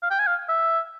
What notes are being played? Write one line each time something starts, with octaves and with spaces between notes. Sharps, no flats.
F5
G5
G#5
F5
E5